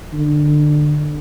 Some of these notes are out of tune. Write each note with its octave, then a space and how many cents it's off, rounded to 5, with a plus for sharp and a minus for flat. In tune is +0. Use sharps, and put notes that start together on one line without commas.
D3 +20